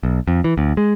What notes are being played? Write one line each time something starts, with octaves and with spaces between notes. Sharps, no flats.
B1
F2
E3
D2
G#3